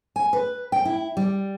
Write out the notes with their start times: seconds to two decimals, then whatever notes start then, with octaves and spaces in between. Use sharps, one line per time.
0.16 G#5
0.33 B4
0.72 G5
0.85 E4
1.17 G3